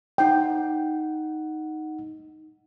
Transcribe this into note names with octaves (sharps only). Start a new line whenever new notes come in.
D#4 F#5 G5